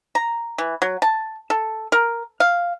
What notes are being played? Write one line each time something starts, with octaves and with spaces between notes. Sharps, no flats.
A#5
E3
F#3
A5
A4
A#4
F5